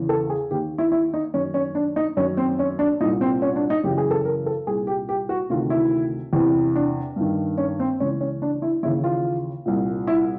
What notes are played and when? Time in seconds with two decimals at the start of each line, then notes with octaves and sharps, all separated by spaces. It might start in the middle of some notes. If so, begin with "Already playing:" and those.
Already playing: E2 C#3 E3
0.09 A4
0.30 G#4
0.51 D#2 D#3 G4
0.78 E4
0.92 E4
1.14 D#4
1.34 F#2 D#3 C#4
1.54 C#4
1.75 D4
1.96 D#4
2.17 F#2 C#4
2.20 D#3
2.37 C4
2.59 C#4
2.79 D4
3.00 A#2 D#4
3.03 C2
3.21 C4
3.42 C#4
3.56 D4
3.70 D#4
3.84 F#2 C#3 E3 G4
3.98 G#4
4.11 A4
4.25 A#4
4.46 A4
4.67 C2 A#2 G#4
4.87 G4
5.09 G4
5.29 F#4
5.50 D2 C3 D#3 F4
5.70 E4
6.33 E2 C3 E3
6.76 D4
7.16 G2 D#3
7.58 C#4
7.80 C4
8.00 C#2 C#3 E3 C#4
8.21 C#4
8.42 D4
8.62 E4
8.83 D#2 C#3 E3 E4
9.04 F4
9.66 C2 A#2
10.07 E4